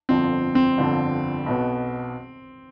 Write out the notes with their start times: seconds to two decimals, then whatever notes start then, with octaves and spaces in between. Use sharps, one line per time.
0.09 G1 F2 D3 F3 C4
0.55 C4
0.78 G1 F2 D3 F3
1.46 B1 B2 B3